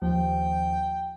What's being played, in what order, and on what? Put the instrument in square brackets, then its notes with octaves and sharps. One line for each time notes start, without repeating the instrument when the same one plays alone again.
[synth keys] D#2 F3 [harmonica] G5